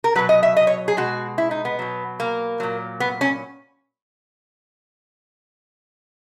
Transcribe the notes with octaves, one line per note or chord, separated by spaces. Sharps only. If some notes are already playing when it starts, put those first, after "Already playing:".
A#4
B2 F#3 B4
D#5
E5
D#5
C#5
G#4
B2 G#3 F#4
E4
D#4
B3
B2 F#3
A#3
A#2 F#3
B3
C#4